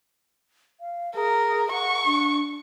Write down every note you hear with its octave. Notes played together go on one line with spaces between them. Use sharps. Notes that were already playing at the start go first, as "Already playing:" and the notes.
F5
G#4 A#4
F#5 C#6
D4